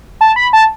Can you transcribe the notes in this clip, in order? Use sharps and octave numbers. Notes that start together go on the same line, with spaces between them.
A5
B5
A5